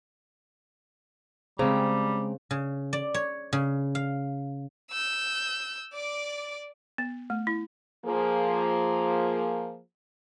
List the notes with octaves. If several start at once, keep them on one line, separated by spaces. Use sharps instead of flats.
C#3 G3 G#3 C4 C5 G5 A#5
C#3
D5
C#5
C#3
F5
E6 G6
D5 D6
B3
A3
E4
F3 A#3 G#4